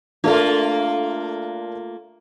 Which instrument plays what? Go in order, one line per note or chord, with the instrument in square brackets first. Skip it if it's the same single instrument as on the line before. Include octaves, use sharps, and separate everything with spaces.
[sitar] A3 A#3 F4 [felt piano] D4 A4 A#4